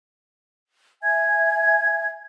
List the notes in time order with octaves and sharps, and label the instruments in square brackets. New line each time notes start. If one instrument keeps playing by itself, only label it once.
[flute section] E5 G#5 G#6